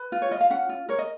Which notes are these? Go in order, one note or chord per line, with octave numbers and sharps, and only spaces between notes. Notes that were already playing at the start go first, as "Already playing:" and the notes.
Already playing: B4
F4
C#5
F4 D#5
F5
C#4 F#5
F4
A#4 C#5
D#5